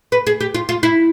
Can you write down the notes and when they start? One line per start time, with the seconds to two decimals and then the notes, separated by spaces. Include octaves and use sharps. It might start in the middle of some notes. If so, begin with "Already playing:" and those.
0.12 B4
0.27 G#4
0.41 G4
0.54 F4
0.69 F4
0.83 E4